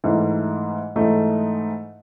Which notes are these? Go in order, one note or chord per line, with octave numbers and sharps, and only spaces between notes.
G#2 E3 A3 D#4
G#2 E3 A3 D#4